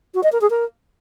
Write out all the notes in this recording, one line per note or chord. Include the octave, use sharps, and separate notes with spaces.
F#4
D#5
A#4
G#4
A#4